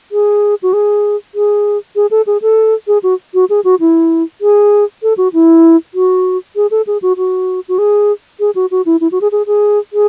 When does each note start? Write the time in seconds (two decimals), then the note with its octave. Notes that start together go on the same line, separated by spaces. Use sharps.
0.12 G#4
0.63 F#4
0.73 G#4
1.35 G#4
1.96 G#4
2.11 A4
2.27 G#4
2.42 A4
2.87 G#4
3.03 F#4
3.34 F#4
3.50 G#4
3.64 F#4
3.80 E4
4.41 G#4
5.03 A4
5.18 F#4
5.33 E4
5.95 F#4
6.56 G#4
6.71 A4
6.87 G#4
7.02 F#4
7.17 F#4
7.68 F#4
7.78 G#4
8.40 G#4
8.55 F#4
8.71 F#4
8.86 E4
9.01 E4
9.12 F#4
9.21 G#4
9.32 G#4
9.47 G#4
9.93 G#4